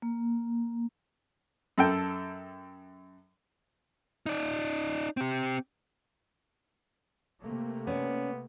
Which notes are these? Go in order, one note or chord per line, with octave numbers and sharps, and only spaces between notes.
A#3
F#2 A4 G5
D#4 D5
C4 G4
C3 A3 A#3
B3 C#4 D5